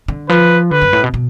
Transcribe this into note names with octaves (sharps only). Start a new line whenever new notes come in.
D3
F3 B4
D3 B4
F#2
A2
B2
B2